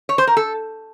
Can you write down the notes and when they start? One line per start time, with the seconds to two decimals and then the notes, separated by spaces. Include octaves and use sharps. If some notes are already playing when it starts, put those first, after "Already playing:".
0.09 C#5
0.18 C5
0.27 A#4
0.37 A4